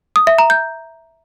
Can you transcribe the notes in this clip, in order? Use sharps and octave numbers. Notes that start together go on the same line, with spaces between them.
D#6
E5
A#5
G6